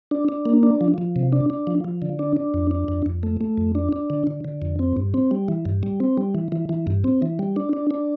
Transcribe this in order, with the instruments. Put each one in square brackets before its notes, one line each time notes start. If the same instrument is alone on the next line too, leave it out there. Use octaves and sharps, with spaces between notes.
[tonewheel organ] D4
D4
A#3
D4
F3
F3
C3
D4
D4
F3
F3
D3
D4
D4
F2
D4
F2
F2
A3
A3
F2
D4
D4
D3
D3
D3
F2
C4
G2
C4
G3
E3
G2
G3
C4
G3
E3
E3
E3
G2
C4
E3
G3
D4
D4
D4